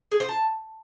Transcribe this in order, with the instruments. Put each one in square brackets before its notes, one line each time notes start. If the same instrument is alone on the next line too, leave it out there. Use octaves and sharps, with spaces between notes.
[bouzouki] G#4
C5
A5